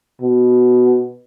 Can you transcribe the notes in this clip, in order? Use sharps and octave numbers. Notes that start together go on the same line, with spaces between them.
B2